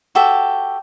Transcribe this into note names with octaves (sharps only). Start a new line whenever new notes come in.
F#4 G4 A4 E5